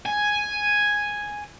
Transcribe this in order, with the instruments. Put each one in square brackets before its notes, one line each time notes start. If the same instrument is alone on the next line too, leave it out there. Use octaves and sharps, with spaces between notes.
[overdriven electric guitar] G#5